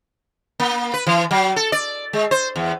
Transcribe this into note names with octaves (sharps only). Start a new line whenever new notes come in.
A#3
B4
E3
F#3
A4
D5
G#3
C5
E2